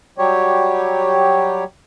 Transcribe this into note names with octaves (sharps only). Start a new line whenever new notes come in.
F#3 G3 G4 C#5